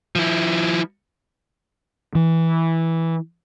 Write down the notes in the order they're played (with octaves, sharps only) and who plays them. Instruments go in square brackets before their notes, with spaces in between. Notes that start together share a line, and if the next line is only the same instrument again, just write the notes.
[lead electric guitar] F3 E4
[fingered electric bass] E3